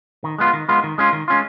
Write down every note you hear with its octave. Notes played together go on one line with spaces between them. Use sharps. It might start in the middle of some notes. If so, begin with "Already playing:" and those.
D#3
G#3 B3 F4
D#3
G#3 B3 F4
D#3
G#3 C#4 F4
D#3
G#3 C#4 F4